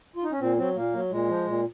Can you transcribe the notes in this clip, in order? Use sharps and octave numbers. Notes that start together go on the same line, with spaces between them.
F4
D#4
C#4
A#2 C4
F#3 C4
A#2 A#3
F#3
A#2 G#3
F3
A#2